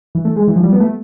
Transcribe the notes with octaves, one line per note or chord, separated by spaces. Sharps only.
E3
A3
G#3
E3
F3
G3
B3
A3